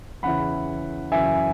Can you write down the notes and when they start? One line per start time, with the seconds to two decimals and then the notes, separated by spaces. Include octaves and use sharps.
0.23 E2 C#3 E3 F#5 B5
1.12 F#2 C#3 E3 E5 G#5